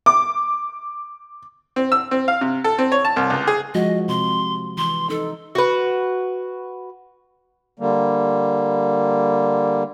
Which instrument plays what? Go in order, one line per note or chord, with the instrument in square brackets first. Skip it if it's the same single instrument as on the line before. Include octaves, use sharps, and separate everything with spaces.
[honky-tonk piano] D6
[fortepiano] C4
E6
C4
F5
C3
A4
C4
C#5
A5
C2
C#2
G#4
[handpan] F3 G#3 F#4 [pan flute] D#5
[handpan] C3 [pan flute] C6
[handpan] E3 [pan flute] C6
[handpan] D#4 [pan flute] A4
[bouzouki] F#4 B4
[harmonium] D3 G3 A#3